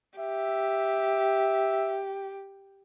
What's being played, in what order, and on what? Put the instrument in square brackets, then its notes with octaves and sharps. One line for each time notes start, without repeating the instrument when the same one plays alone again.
[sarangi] G4 [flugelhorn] E5